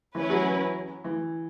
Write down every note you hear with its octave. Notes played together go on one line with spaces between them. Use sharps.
E3 C#4 E4 B4
F#3
E3